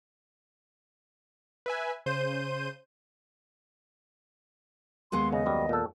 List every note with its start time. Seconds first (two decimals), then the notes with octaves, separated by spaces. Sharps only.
1.66 B4 E5 G#5
2.06 C#3 C5 G6 D#7
5.12 D#2 G#3 B3 C6
5.33 C#3 D#5
5.46 F#2 G3
5.69 A#2 A4